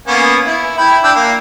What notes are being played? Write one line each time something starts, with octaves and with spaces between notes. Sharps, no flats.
A#3 B3 C#4
E4
E4 G5 B5
D4 G5 E6
A#3